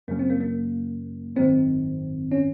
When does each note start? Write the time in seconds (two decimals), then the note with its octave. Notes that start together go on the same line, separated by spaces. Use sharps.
0.08 F#2 C#3 F#3 A#3 C#4
0.19 C4
0.30 A#3
0.40 A#3
1.36 G#1 F#2 D#3 C4
2.31 C#4